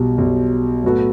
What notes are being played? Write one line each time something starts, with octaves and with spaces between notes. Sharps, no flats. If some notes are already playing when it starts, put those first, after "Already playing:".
Already playing: B1 B2 G3
B1 B2 G3
A2 F#3 B3 F#4 A4